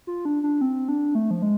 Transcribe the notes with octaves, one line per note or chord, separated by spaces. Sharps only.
F4
D4
D4
C4
D4
A3
F3
G#3